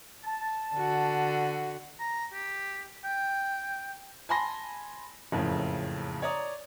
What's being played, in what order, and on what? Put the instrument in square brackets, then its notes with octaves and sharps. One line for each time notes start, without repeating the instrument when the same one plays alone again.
[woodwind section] A5
[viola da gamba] D3 F#4
[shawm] A#5
G4
G5
[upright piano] G#5 A5 B5 C6 A#6
F#1 F2 A2 C#3
C#5 D5 A#5 D#6